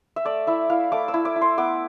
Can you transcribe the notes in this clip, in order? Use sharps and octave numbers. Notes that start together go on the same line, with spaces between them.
E5
A3 D5
E4 E5
E4 F5
A3 D6
E6
E4
D6
E4
C6
B3 D6